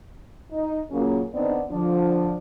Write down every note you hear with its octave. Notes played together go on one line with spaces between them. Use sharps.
D#4
A#2 C#3 F#3 A#3 C#4
D3 B3 C4 D4 D#4 D5
D3 F3 D4